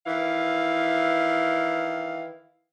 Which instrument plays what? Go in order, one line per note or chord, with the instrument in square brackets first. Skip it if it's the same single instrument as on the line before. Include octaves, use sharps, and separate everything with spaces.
[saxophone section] D#3 E3 E4 F5